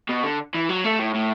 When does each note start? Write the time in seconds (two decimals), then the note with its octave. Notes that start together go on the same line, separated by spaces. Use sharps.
0.09 B2
0.23 D3
0.54 E3
0.69 F#3
0.84 A3
1.00 A2
1.14 A2